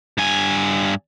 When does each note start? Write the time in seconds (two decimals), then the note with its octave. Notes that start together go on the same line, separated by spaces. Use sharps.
0.18 G2 G#5